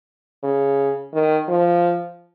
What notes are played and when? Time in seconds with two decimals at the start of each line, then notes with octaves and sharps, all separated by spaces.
0.44 C#3
1.13 D#3
1.48 F3